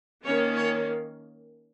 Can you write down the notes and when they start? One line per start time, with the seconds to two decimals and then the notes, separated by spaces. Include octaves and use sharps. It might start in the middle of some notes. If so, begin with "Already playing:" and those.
0.25 D#3 A#3 C#4 C#5
0.57 C#5